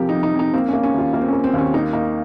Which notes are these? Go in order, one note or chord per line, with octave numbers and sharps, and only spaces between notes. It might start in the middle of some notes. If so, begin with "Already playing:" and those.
Already playing: F2 C3 F3 G4 A#4
D#4
F2
D#4
F2
D#4
A#3 C4
C#4
A#3
C#4
D#2 F4
A#3 F4
C4
C#4
A#3
C4
D#2 C#4
A#3 D#4
A#3 D#4